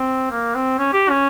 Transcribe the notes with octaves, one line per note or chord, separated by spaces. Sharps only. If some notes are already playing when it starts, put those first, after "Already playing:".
Already playing: C4
A#3
C4
C#4
G4
C#4